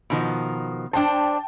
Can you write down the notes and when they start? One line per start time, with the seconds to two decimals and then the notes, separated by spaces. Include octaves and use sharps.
0.10 B2 D#3 F3
0.93 D4 C5 G5 A5